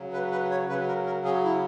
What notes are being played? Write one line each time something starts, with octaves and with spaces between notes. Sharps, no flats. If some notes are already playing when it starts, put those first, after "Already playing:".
Already playing: C#3 F#3
B4
B4
C#5
C#3 F#3 B4
A#4
A#4
G#4
E4